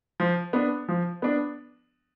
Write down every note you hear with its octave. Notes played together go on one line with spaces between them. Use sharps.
F3
B3 D4
F3
B3 D4